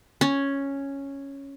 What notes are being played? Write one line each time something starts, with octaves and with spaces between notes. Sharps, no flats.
C#4